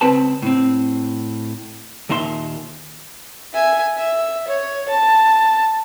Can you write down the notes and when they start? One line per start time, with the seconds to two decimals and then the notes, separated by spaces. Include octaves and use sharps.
0.01 C#2 C4 B4 A5
0.42 A2 C4
2.09 D#2 A#2 D#4 E5 C6
3.54 E5 G#5
3.97 E5
4.47 C#5
4.88 A5